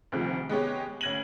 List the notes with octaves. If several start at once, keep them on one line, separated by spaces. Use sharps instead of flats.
D2 C3 D#3 F3
G#3 B3 G4 C#5
D2 C#4 G#6 A#6 D#7 F#7